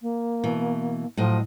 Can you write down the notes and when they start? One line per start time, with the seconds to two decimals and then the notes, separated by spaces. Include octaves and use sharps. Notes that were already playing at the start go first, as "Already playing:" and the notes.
0.02 A#3
0.44 B2 E3
1.17 A2 F3 F#3 D#5